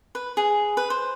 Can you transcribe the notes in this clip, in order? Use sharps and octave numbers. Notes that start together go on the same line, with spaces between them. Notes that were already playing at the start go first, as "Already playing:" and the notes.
B4
G#4
B4
C5